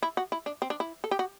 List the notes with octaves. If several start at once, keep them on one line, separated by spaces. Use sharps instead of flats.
E4
F#4
E4
D4
C4
D4
E4
A4
G4
F#4